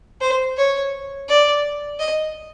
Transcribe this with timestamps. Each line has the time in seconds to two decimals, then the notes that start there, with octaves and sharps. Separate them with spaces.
0.21 C5
0.57 C#5
1.29 D5
1.99 D#5